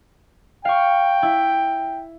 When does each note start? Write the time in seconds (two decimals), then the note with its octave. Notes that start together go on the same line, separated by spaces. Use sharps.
0.65 F5 G5 C#6
1.22 E4